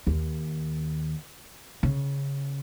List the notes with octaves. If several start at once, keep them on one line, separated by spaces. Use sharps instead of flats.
D#2
C#3